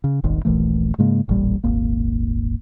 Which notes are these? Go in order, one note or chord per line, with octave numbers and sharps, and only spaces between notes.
C#3
D#1 G#1 G#2 D#3
D#1 A#1 E3 A3
G#2 C#3 G#3 A#3
E1 A1 A#2 G3
D#1 G#1 A#3